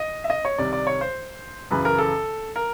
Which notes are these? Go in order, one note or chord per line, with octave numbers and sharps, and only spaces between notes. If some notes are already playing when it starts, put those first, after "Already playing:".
Already playing: D#5
E5
D#5
C#5
C2 C3 D#3 D5
D5
C#5
C5
F#2 C#3 E3 B4
A#4
A4
A#4